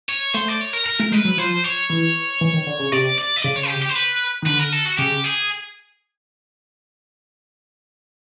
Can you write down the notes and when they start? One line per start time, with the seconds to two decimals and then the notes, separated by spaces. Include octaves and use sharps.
0.09 C#5
0.34 A3 C5
0.48 D5
0.61 C#5
0.73 A#4
0.86 A#4
0.99 A3 A#4
1.12 G#3 B4
1.25 F#3
1.38 F3 C5
1.64 C#5
1.90 E3
2.41 E3
2.53 D#3
2.67 D3
2.79 C#3
2.92 C3 D5
3.19 D5
3.37 D#5
3.43 C#3 D5
3.57 C#5
3.69 G4
3.82 G4
3.89 C5
3.95 B4
4.42 D#3
4.46 D3 B4
4.60 A#4
4.73 A4
4.86 F#4
4.98 C#3 G4
5.24 G#4